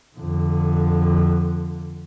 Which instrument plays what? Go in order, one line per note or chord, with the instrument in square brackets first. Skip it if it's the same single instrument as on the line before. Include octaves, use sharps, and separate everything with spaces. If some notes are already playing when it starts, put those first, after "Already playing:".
[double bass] F2 D3